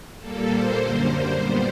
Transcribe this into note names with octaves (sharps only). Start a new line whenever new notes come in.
A#2 G3 A#3 A4
C5
F#2 D3 G3 A#3
C5
A#2 G3 B3